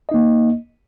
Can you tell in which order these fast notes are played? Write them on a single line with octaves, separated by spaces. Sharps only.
D#5 D#4 A#3